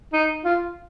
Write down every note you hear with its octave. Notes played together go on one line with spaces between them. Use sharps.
D#4
F4